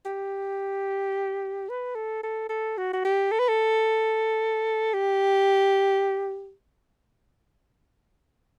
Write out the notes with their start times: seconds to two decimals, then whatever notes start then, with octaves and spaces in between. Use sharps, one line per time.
0.06 G4
1.69 B4
1.95 A4
2.23 A4
2.49 A4
2.78 F#4
2.93 F#4
3.05 G4
3.32 A4
3.39 B4
3.49 A4
4.94 G4